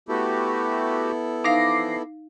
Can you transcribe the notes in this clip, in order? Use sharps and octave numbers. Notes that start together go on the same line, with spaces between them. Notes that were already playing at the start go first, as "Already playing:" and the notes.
A3 B3 E4 F#4 G4 A4
E3 F3 D#4 F5 D6 A#6 C7